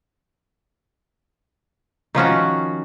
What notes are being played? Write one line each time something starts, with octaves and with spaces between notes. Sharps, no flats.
D#3 F3 C#4 F#4